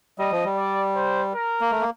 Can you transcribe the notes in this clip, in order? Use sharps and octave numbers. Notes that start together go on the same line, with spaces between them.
G3 D#5
F3
G3
D5
C5
A#4
A#3
A3
A#3